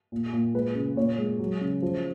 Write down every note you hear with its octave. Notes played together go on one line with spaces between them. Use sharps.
A#2
A#2
G#3 B4
C#3
A#2 C#5
G#3
F#3
C#3
F3